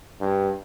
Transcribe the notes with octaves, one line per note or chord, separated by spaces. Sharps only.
G2